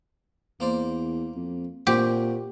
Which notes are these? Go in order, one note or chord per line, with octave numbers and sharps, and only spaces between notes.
E2 A#3 C5 D5
F2
A#2 C4 F#4 G4